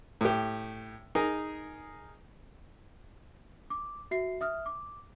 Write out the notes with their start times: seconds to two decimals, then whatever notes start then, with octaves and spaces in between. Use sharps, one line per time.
0.21 A2 G4
1.15 D#4 G#4 A#4
3.70 D6
4.11 F#4 E5 C7
4.41 E5 D#6 F6
4.66 D6